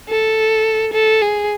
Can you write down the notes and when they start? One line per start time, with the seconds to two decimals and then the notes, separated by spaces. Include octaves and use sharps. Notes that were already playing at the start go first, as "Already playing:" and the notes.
0.09 A4
0.93 A4
1.22 G#4